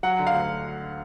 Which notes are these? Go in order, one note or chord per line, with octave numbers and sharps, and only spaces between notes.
F#3 F#5
D3
F5
D2